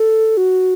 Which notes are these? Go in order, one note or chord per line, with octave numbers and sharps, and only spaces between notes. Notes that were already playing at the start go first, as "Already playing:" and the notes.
Already playing: A4
F#4